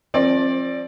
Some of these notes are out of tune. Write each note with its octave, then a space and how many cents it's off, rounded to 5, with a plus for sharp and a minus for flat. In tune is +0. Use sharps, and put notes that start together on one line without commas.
F3 +0 C4 +30 D5 +0